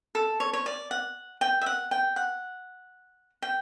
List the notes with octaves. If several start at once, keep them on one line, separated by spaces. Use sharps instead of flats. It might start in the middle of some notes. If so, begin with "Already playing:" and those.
A4
C#5
C#5
D5
F#5
G5
E5
F#5
G5
F#5
G5